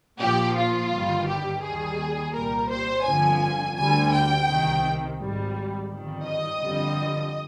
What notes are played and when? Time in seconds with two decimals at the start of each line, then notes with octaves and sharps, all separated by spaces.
0.20 A#1 A#2 F3 G4
0.55 F4
0.91 G1 G2 D#3 G3
1.27 G4
1.62 D#2 D#3 G3 G#4
2.33 C2 A#2 G3 A#4
2.69 C5
3.05 G1 F2 D3 F3 G#5
3.76 D2 D3 G3 G#5
4.12 G5
4.47 C2 C3 D#3
5.18 G#1 G#2 G3
5.90 G1 F2 D#3 G3
6.25 D#5
6.61 G1 F2 D3 G3